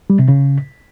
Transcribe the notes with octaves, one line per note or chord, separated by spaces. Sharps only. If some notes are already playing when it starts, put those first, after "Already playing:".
G3
C3
C#3